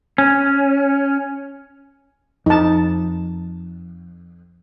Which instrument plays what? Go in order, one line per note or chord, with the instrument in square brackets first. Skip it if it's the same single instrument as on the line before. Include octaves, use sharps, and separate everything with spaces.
[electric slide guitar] C#4
[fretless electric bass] F2 [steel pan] D#4 A5